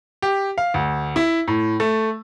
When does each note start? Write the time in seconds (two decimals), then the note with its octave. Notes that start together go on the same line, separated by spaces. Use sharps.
0.22 G4
0.58 F5
0.74 D2
1.16 E4
1.48 A2
1.80 A3